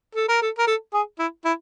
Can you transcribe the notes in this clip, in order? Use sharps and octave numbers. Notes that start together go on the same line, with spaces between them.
A4
A#4
A4
A#4
A4
G#4
E4
E4